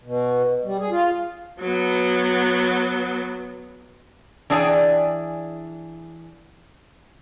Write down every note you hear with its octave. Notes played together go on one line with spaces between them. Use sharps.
B2
G3
G#4
F4
F#3 B3
E3 D4 G#4 D5 G5 G#5